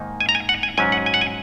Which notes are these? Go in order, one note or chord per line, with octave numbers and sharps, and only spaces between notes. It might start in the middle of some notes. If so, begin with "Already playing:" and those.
Already playing: G#2 D#3 A#3 D#4
G#5
A#5
G#5
F#5
G#5
G#2 F#3 C#4 G#5
F#5
G#5
F#5
G#5